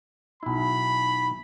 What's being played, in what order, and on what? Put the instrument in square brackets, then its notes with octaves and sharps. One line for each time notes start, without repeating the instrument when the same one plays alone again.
[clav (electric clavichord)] B1 E4 [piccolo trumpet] B5